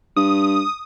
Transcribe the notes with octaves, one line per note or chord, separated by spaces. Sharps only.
G2 D#6